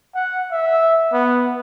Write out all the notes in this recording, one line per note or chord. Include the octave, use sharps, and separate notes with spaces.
F#5
E5
B3